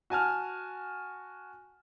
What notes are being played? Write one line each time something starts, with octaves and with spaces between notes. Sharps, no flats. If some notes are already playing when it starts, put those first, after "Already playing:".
F#4 G#5 A5 F6